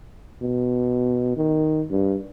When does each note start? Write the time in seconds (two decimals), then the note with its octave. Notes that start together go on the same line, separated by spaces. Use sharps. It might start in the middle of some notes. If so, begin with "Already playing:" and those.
0.42 B2
1.36 D#3
1.90 G2